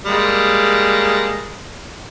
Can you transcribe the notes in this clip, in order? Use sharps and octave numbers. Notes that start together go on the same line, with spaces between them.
G3 G#3 A#3